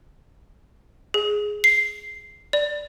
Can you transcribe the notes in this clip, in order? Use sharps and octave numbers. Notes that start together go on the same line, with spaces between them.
G#4
C7
D5